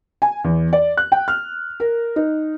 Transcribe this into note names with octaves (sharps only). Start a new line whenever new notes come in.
G#5
E2
D5
F#6
G5
F6
A#4
D#4